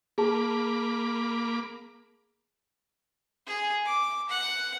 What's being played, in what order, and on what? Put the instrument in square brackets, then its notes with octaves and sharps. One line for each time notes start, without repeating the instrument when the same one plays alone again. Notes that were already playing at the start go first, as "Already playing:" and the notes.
[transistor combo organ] A#3 B5 D6 [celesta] G#4 A5
[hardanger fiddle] G#4
D6
F#5